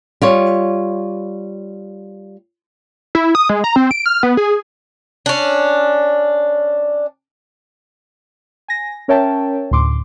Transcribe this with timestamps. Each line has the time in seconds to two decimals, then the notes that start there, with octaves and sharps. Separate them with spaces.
0.22 G3 F4 C#5
3.15 E4
3.35 D#6
3.49 G#3
3.64 A#5
3.76 C4
3.91 D7
4.06 F6
4.23 B3
4.37 G#4
5.26 C#4 D4
8.68 G#5 A#6
9.08 C#4 A#4 C#5 E5 G5 A5
9.71 D2 A2 C6 D6